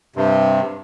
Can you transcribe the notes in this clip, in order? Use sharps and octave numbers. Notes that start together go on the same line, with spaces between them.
G2 C3